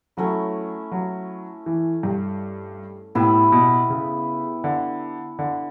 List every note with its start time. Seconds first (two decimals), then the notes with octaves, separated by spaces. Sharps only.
0.17 F#3 A3 C#4 E4
0.92 F#3
1.66 E3
2.03 G2
3.15 A2 B3 E4 G4 B4
3.52 B2
3.90 C#3
4.64 D3
5.39 D3